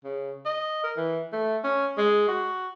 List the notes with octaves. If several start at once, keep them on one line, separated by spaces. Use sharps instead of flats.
C#3
D#5
A#4
E3
A3
C#4
G#3
F#4